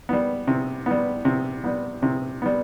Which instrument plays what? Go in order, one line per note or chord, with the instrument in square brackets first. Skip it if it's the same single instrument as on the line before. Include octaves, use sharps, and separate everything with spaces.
[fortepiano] G3 B3
C3
G3 B3
C3
G3 B3
C3
G3 B3